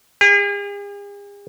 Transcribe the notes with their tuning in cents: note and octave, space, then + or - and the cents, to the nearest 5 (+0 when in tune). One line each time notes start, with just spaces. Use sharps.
G#4 -45